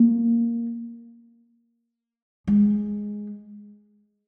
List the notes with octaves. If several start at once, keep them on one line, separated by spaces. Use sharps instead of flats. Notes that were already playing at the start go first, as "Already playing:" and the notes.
Already playing: A#3
G#3